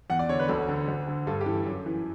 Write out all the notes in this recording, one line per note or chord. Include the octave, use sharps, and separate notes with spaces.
E2 F#5
D5
D3 C#5
B4
D2 A4
D3
D2
D3
G2 A4
G4
E3 A4
F#2
E3